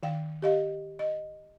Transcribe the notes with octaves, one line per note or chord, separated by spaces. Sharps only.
D#3 F5 G5
G4 D#5 F5
D#5